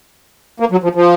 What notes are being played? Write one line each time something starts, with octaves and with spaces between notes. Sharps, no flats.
A#3
F#3
F3
F3